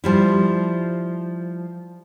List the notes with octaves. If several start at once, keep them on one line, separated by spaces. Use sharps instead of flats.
F3 G3 E4